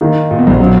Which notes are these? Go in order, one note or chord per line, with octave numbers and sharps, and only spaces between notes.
D#3 A#3 D#4
A#2
B2
A#1 A#2
F#3 C#4